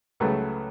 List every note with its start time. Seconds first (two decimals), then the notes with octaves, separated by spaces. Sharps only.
0.20 C#2 C#3 F#3 A3 B4